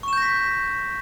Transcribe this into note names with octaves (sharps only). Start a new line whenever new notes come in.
C#6 G6 A#6 B6 E7